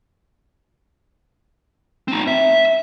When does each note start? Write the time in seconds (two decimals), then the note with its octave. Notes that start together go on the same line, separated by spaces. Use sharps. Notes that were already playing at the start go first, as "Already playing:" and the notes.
2.08 C4 D#4
2.27 E5